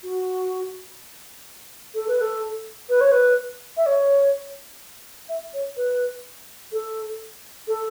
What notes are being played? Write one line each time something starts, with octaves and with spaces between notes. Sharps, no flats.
F#4
A4
B4
A4
B4
C#5
B4
E5
C#5
E5
C#5
B4
A4
A4